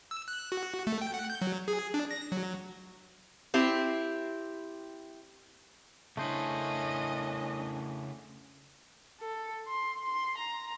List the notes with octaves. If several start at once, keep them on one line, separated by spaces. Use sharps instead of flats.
E6
F#6
F#4
A3
G5
F#5
G6
F#3
G#4
D4
A#6
F#3
C4 E4 G4
C#3 A3 C#4 D4 E4 C5 D#5
A4
C6
C6
A#5